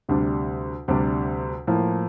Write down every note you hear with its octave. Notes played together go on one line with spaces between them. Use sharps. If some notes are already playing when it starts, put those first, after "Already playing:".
D2 C3 G3 D4
D2 C3 G3 D4
A2 F3 A#3